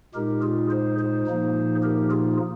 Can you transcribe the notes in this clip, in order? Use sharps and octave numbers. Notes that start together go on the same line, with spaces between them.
A#2 G#3 D#4 G4 A#4
F4 G#4
G#4 C5
G#4 C5
A#2 F3 A#3 D#4
G4 A#4
F4 G#4